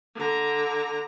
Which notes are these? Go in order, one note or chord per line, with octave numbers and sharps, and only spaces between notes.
D3 A#5